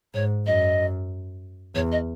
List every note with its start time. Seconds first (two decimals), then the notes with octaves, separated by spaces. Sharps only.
0.14 G#2 C#5
0.46 F#2 D#5
1.75 E2 C#5
1.92 D#5